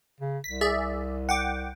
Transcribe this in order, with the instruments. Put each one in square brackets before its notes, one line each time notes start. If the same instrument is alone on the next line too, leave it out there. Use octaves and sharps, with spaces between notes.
[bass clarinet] C#3
[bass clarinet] C2 [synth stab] B6
[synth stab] G#4 D5 E5
F#5 G5 D6